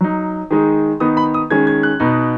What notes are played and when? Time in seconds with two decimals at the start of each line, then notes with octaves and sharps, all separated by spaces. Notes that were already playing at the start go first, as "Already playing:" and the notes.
0.01 F#3 D#4
0.51 D#3 G#3 D#4
1.00 D#3 B3 D#4 D#6
1.17 B5
1.34 D#6
1.50 D#3 G#3 C#4 G#6
1.67 G#6
1.83 F#6
2.00 B2 B3 D#4